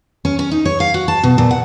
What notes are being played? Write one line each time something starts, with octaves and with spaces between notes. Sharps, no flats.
C#4
C#4
D#4
C#5
F5
F#4
A5
B2
A#2
F#5